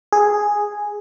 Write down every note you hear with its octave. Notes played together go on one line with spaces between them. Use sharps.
G#4